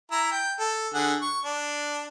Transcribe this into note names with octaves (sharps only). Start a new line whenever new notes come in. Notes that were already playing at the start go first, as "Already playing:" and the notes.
E4 A#5 E6
G5
A4
D3 G#4 F#5
C#6
D4